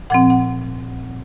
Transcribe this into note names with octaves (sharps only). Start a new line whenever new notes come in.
A#2 F3 C4 F#5
F#5